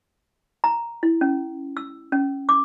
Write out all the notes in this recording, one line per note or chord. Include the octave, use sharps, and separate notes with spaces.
A#5
E4
C#4
E6
C#4
D6